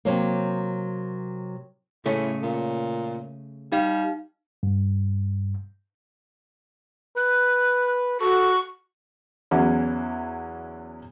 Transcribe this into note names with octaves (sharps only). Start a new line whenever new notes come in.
C3 F#3 A#3
A2 C#3 A3 C#4
A#2
G3 D#4 F5
G2
B4 F#6
F#4 A4 C#6
E2 E3 F#3 C#4 E4